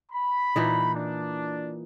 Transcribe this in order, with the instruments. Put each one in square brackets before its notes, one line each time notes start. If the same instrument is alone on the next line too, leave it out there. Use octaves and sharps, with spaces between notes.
[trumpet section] B5
[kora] A#2 E3 D#4
[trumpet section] D4